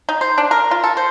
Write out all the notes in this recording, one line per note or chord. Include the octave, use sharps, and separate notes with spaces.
D#4
C5
D4
A#4
F4
A4
C5